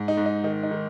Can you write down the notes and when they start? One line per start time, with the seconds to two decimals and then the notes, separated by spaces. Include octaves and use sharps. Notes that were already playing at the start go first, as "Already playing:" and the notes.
Already playing: G#2
0.08 D#4
0.17 G#2
0.26 D#4
0.44 D#3 D#4
0.63 D#4
0.71 D#3